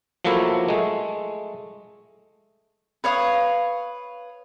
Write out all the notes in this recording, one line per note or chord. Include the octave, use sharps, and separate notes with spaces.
F3 F#3 A3 A#3 E4
G#3 A3
B4 C#5 F5 D#6